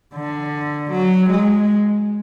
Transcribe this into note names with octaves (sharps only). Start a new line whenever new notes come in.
D3
F#3
G#3